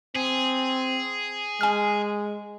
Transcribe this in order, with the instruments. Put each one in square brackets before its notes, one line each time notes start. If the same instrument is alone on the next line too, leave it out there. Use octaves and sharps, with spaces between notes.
[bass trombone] C4 [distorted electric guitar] G#4
[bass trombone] G#3 [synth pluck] G#5 F6